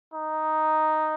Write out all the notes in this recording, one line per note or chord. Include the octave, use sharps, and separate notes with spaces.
D#4